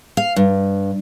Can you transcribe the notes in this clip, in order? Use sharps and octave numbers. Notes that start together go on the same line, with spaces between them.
F5
G2